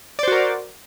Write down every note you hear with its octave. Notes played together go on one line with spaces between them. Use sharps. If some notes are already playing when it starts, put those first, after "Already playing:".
F#4 A#4 C5 D5